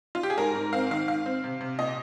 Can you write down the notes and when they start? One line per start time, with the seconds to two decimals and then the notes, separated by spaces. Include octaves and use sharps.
0.15 F4
0.23 G4
0.30 G#4
0.38 G#2 A#4
0.55 G#2
0.73 C4 F5
0.91 D#3 F5
1.08 G#2 F5
1.26 C4
1.44 C3
1.61 C3
1.79 A#2 D#5